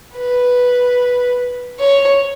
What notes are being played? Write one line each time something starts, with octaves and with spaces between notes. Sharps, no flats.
B4
C#5